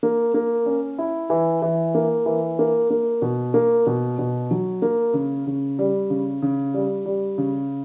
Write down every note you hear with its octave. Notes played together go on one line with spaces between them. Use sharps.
A#3
A#3
C#4
E4
E3
E3
A#3
E3
A#3
A#3
B2
A#3
B2
B2
F#3
A#3
C#3
C#3
G3
C#3
C#3
G3
G3
C#3